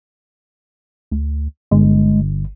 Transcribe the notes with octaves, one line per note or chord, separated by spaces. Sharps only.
D2
G1 G#3